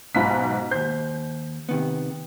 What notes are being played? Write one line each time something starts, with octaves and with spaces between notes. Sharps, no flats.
B1 G#2 B2 B5 B6
D#2 C5 G6
C3 D#3 B3